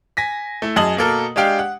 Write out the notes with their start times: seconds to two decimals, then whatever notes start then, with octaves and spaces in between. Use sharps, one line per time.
0.17 G#5 A#6 B6
0.62 A3 E4
0.76 F#2 G#4 D#5 A5 D#6 F#7
0.97 B2 A#3 A4 A#4
1.36 G#3 D4 G4 F5 G5
1.59 F#5